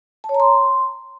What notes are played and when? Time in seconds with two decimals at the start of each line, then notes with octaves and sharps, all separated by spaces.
0.24 A5
0.29 C#5
0.34 A#5
0.40 C6